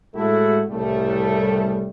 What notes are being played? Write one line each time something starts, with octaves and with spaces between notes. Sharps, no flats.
A2 G#3 A3 E4 F#4 A4
C2 A2 C#3 G3 A3